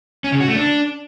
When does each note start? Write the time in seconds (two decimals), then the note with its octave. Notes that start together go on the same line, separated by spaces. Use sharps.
0.24 C#4
0.32 C#3
0.40 F#4
0.48 A3
0.56 D4